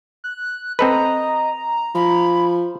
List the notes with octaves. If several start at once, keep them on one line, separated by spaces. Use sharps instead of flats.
F#6
C4 A4 B4 D#5 A#5
F3 B5